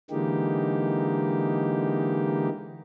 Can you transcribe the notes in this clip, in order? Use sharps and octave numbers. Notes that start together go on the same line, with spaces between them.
D3 E3 G#3 A#3 D#4 G4